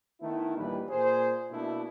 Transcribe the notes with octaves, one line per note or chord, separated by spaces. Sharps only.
D#3 A3 B3 E4
A#1 D#2 E3 G3 B4
A#2 G#4 C5
B2 A3 A#3 D4 E4